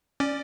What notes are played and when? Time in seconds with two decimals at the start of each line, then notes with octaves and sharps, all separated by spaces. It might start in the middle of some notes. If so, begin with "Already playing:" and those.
0.20 C#4 D5